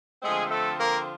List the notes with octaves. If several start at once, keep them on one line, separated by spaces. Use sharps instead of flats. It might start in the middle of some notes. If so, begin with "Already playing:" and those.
D3 F3 G#3 A3 C4 G#4
A3 A4
A#3 A#4